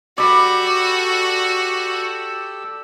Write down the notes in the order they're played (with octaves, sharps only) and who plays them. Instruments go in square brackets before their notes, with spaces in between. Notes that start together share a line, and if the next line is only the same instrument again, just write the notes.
[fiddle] F#4 [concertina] G4 A4 E6 [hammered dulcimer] D5 B5